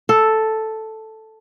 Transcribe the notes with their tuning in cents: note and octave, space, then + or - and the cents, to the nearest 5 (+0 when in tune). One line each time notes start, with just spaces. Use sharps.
A4 +0